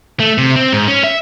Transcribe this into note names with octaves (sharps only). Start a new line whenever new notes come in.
A3
C3
C4
G#2
C#4
E5